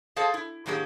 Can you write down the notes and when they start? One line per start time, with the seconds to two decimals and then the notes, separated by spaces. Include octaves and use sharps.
0.16 G#4 A4 C5 D#5 F5 A5
0.34 E4
0.66 A2 D#3 F#3 A#3 G4 G#4